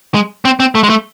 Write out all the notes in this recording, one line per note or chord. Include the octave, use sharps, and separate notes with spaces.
G#3
C4
C4
A3
G#3
A3